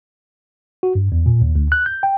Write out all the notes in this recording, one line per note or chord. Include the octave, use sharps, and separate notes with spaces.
F#4
G2
E2
A#2
D#2
D2
F#6
G6
G5